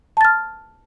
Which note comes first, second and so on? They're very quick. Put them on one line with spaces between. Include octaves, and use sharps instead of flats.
A5 A6 F6